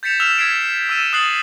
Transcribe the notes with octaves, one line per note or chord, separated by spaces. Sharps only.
G6 A6 B6 C#7 E7 F7
E6 F6 B6 E7 F7
E6 G#6 B6 C7 D7
E7
E6 A6 D#7 E7
D#6 F#6 A6 C7 F#7